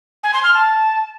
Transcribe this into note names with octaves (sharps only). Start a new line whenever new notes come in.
G#5
C6
F6
A5